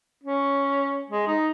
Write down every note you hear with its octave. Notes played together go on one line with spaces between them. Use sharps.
C#4
G#3
D#4